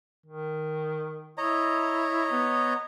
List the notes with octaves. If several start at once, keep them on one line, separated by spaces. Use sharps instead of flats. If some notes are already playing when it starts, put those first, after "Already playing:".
D#3
E4 C#5 D#5 A#5
B3